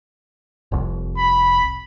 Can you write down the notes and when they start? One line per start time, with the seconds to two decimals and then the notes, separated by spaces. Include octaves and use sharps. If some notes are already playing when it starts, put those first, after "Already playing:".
0.72 F1 C2
1.17 B5